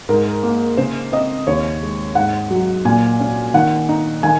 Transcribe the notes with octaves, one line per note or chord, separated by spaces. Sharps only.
G#2 A#4
A#3
C#3 C5
C4 D#5
D#2 C#5
G#3
G#2 F#5
F#3
A#2 G#5
C#4
D#3 F#5
D#4
D#3 G#5